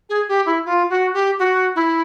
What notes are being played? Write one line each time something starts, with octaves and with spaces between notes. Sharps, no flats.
G#4
G4
E4
F4
F#4
G4
F#4
E4